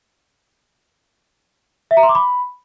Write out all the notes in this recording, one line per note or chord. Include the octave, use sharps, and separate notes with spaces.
E5
A#5
C6
D6
B5